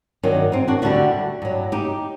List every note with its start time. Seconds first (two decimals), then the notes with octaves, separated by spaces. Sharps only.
0.23 G2 D#3 F#3
0.52 C4 D#4
0.68 D4 F#4
0.82 D2 D3 G3 D4 F#4
1.42 G2 F#3
1.72 D#4 G4